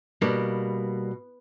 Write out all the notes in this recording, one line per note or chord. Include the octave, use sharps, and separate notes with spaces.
B2 G3 A#3 D4